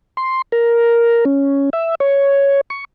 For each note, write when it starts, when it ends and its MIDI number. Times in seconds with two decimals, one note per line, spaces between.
0.17 0.42 84
0.52 1.25 70
1.25 1.70 61
1.73 1.95 76
2.00 2.61 73
2.70 2.85 85